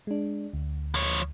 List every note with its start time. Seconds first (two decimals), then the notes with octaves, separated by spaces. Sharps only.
0.07 G#3 D4
0.53 D2
0.95 F3 C#5